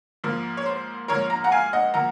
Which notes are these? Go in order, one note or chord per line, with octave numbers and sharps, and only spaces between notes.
G#2 F3 A#3
C#5
C5
G#2 F3 A#3 A#4 C#5
A#5
F#5 A#5
F5 G#5
D#5 F#5
F3 A#3 F#5 A#5